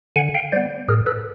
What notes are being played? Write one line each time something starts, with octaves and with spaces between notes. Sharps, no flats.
D3 F#5 G#5
F5 G5
G3 B3 C5 D5
A2 G#4 A#4
A4 B4